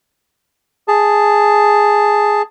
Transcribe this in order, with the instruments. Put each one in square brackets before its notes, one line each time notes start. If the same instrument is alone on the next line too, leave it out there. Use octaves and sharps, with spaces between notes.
[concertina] G#4 A5